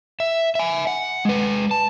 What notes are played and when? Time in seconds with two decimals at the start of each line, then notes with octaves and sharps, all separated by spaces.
0.20 E5
0.55 E5 G#5
0.87 F#5
1.25 G#3 B4
1.71 A5